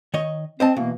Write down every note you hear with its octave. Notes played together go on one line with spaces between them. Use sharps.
D#3 C#5 D#5
C4 C5 D#5 A5
B2 E3 A#3